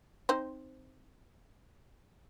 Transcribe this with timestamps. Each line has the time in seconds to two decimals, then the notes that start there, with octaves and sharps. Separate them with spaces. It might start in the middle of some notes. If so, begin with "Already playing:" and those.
0.29 C4 D#4 C5